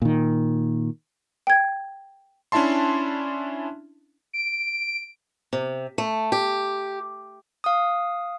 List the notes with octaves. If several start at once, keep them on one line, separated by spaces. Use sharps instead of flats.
A#2 D#3
G5 G#6
C#4 D4 E4 E5 A5 C6
D7
C3
A3
G4
F5 D#6